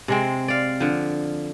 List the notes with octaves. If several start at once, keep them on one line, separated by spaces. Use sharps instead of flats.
C3 G#3 C4
D5 F5
D3 F3